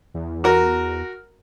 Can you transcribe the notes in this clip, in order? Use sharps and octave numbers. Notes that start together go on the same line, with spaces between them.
E2
F#4 A#4